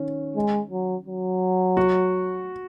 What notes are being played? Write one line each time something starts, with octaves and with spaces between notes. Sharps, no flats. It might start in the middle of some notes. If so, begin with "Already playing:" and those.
Already playing: D#3 C#4
G#3
F#3
F#3
F#4